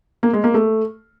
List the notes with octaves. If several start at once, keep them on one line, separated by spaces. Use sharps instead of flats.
A#3
G#3
A#3
A3